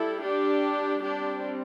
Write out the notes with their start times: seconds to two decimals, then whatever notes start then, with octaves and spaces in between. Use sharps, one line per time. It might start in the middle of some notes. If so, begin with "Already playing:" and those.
Already playing: G3 E4 A4
0.24 D4 G4
1.03 G3 C4 D4 G4